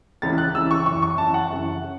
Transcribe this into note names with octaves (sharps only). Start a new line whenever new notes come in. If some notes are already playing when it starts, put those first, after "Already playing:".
C#2 C#3 E3 A6
F#6
C#2 C#3 E3 E6
C#6
F#2 E3 C#6
C#6
F#2 E3 A5
F#5
F#2 C#3 E3
C#3